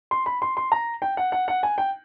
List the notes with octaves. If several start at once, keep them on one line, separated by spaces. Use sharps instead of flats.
C6
B5
C6
C6
A#5
G5
F#5
F#5
F#5
G#5
G5